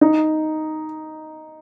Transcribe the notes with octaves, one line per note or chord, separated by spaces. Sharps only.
D#4